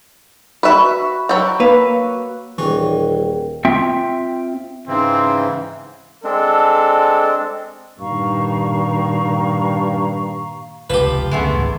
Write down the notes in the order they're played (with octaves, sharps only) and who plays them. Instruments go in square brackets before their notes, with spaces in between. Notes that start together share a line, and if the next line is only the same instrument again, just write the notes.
[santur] F#4 B5 [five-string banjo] B4 E5
[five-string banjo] F#3 G5 [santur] E5 F#5
[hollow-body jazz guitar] A#3 B4 F5
[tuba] D#1 [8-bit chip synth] E3 C#6 [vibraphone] G#4 A#4 G5
[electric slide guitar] C4 F4 E5 G5
[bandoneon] G#2 C#3 E3 [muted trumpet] C4
[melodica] G#3 C4 D4 [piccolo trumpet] A4
[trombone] G2 [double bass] A#2 D#3 [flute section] F5 A#5 C#6
[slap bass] F1 C#2 [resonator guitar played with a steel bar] F3 [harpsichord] G4 B4
[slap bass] C#2 F#2 D3 [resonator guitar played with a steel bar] G#3 A3 B3
[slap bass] G#1 C#2